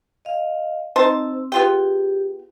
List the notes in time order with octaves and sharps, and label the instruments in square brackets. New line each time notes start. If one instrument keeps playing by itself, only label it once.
[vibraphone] D#5 F5
[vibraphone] C4 E6 [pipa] D#4 C5 A5
[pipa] B3 F4 G5 [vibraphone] G4 G#4